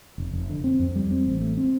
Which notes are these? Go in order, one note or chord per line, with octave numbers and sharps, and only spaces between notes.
F1
F1
D3
C4
F2
G3
C4
A1
A3
C4